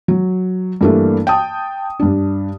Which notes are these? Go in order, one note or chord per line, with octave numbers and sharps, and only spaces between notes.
F#3
G2 E3 A3 A#3 D4
G5 A5 D#6
G2 D4